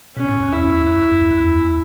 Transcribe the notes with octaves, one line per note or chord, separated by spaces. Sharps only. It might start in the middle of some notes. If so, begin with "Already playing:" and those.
B2 C#4
A2
F#2
E2 E4
E2
F#2
E2
F#2
E2